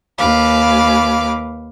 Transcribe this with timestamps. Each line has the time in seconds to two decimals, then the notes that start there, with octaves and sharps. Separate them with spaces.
0.18 D#2 B4 F5 D6